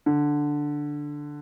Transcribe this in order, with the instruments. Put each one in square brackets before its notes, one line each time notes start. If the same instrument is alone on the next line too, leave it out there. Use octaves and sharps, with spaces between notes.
[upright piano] D3